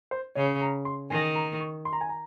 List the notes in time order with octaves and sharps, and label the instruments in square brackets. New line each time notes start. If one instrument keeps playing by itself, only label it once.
[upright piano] C5
[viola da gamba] C#3 [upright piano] C#5
[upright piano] A#5
C6
[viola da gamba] D#3 [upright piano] G#5
[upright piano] A#5
C#6
C6
A#5
G#5
A#5